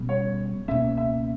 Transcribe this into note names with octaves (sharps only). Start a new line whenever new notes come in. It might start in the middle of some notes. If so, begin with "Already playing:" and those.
Already playing: B2 G3 C#4
C#5
C#2 B2 A#3 C#4 E5
E5